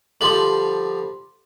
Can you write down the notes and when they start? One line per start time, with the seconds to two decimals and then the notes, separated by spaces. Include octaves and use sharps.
0.21 D3 F3 G3 C6 F#7